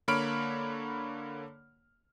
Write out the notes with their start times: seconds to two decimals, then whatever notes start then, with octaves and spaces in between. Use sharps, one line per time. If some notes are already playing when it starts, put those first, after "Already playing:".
0.08 D3 A#3 C#5 B5 F6 D7